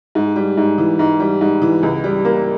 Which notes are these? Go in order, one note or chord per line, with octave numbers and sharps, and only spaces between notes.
G#2
G3
G#2
E3
G#2
G3
G#2
E3
C#2
G3
A#3